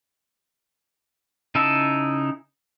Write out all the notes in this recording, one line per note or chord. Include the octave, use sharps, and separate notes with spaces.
C#3 D#4 E4 E5 A5